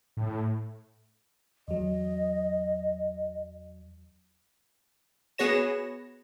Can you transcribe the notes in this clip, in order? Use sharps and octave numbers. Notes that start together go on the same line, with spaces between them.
A2
E2 F#3 D#5
B3 F#4 G#4 C#5 A#6 E7